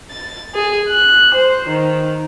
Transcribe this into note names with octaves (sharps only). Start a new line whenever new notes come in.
A6
G#4
F#6
C5
D#3